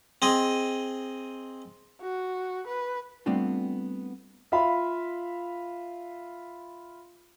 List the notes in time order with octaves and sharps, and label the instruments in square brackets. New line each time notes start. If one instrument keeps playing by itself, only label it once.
[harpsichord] C4 G#4 D#5
[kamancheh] F#4
B4
[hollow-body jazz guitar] G3 A3 B3 C4 D4 F4
[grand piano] F4 E5 F5 B5